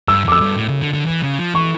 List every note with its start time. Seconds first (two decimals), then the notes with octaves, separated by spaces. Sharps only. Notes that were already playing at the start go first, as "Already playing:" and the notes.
0.08 G2 E6
0.25 F2 D6
0.32 E6
0.41 G2
0.56 A2
0.69 C#3
0.82 D3
0.93 D3
1.06 E3
1.23 C#3
1.39 F3
1.55 E3 C#6